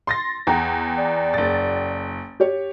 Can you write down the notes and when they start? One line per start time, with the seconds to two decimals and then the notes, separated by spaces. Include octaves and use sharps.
0.07 C6 A6 A#6
0.47 E2 F#5 G5 A#5
0.98 D5
1.34 F#1 A6
2.40 G4 C#5